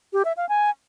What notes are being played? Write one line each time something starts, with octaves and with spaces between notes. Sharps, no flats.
G4
E5
F5
G#5